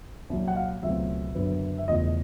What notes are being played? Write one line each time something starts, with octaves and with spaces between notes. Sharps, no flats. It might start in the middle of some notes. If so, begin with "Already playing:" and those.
C2 A#2 F#3
F#5
F5
C#2 B2 F#3 A3 C4 E5
F#1 F#2 D3 F#3 B3
E5
E1 E2 C#3 F3 A3 D#5